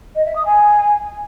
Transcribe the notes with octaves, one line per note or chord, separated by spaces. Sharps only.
D#5
E5
D#6
G#5